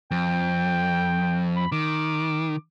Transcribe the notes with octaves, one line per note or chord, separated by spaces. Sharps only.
F2 G5
B5
D#3 D6